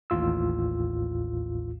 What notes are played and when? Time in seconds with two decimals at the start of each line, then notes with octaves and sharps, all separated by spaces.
0.10 A1 D#2 A2 F4 E6